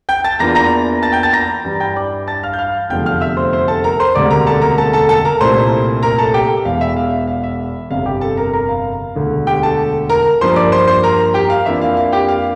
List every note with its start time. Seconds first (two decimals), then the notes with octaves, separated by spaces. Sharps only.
0.09 G5 G6
0.24 A5 A6
0.39 E2 E3 A#3 D4 F4 A#5 A#6
0.55 A#5 A#6
1.02 A5 A6
1.12 G5 G6
1.23 A5 A6
1.33 A#5 A#6
1.65 G2 E3 G3 D4
1.80 G5 G6
1.96 D5 D6
2.27 A5 A6
2.43 F5 F6
2.53 G6
2.59 F5 F6
2.90 F1 E2 D3 F3 A3 G5 G6
3.06 F5 F6
3.21 E5 E6
3.37 C5 C6
3.53 C5 C6
3.68 A4 A5
3.84 A#4 A#5
4.00 C5 C6
4.15 E1 D2 C3 G3 D5 D6
4.31 A#4 A#5
4.46 A4 A5
4.62 A#4 A#5
4.78 A4 A5
4.93 A4 A5
5.09 A4 A5
5.25 A#4 A#5
5.41 C2 A#2 A3 E4 C5 C6
6.03 A#4 A#5
6.18 A4 A5
6.34 G4 G5
6.65 E1 E2 E3 F5
6.81 E5
6.96 F5
7.27 F5
7.43 E5
7.91 G1 F2 C3 F5
8.06 G4 G5
8.21 A4 A5
8.37 A#4 A#5
8.53 A#4 A#5
8.69 F5
9.15 E1 D2 D3
9.47 G4 G5
9.63 A4 A5
10.10 A#4 A#5
10.41 G2 F3 A#3 C5 C6
10.56 D5 D6
10.72 C5 C6
10.88 C5 C6
11.03 A#4 A#5
11.34 G4 G5
11.50 F5
11.66 F2 E3 A#3 D4 F4 E5
11.81 F5
11.97 F5
12.12 G4 G5
12.29 F5